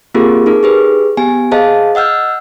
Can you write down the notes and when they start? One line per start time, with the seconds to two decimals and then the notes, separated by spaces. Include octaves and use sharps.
0.14 A#3 C4 F4 G4 G#4 A#4
0.46 D#4 G#4 A#4
0.63 G4 G#4 B4
1.17 B3 G4 G#5
1.52 G#4 C5 D#5 F5 A5
1.95 D#5 F#5 E6 F6 G6